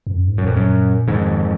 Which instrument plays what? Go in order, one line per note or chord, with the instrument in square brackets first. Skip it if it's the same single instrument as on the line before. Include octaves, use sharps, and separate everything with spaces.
[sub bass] F2
F#2
G#2
[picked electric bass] F#2 [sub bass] A#2
[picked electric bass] F2
F#2
[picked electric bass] F2 G#2 [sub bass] D#3